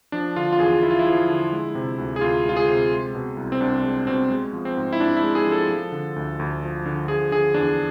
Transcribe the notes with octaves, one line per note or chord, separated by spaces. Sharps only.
F3 D4
D3 F4
F4
E2 G#4
E2 E4
F4
E4
F3
D3
G#3
C3
D2
G#4
D2 F4
G#3 F4
G#4
C3
G#3
B2
C2
C4
C2 D4
G#3
B2 C4
G#3
F3
C4
G#2
E4
G#2 D4
E4
G#3
G#4
F3
A4
F3
D3
D2
D2
F3
D3
F3 G#4
D3 G#4
E2 D4